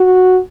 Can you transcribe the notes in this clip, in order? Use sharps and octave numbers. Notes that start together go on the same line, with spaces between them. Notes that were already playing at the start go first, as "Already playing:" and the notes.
Already playing: F#4